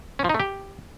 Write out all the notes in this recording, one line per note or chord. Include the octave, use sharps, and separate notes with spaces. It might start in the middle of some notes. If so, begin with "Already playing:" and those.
C#4
F3
D#4
A3
G4